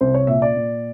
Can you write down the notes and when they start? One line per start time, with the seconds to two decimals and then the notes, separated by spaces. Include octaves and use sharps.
0.01 C2 C5
0.14 C#5
0.27 A#2 E5
0.42 D5
0.56 A#2